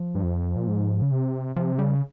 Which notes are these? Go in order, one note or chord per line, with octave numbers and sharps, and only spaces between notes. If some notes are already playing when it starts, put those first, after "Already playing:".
Already playing: F3
G2
F2
A#2
G#2
C#3
C3
C3 F3
C#3 G3